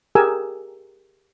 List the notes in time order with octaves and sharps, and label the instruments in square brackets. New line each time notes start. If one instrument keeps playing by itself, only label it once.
[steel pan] G4 G#4 A#4 G#5 E6